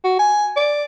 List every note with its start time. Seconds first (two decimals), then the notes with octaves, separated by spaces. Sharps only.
0.04 F#4
0.19 G#5
0.57 D5